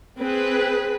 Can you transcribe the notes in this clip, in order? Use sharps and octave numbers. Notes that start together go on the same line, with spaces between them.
C4 G#4 B4